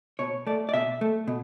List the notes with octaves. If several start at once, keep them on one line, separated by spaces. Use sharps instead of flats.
B2 C#5
A3 D5
D5
B2 E5
A3
B2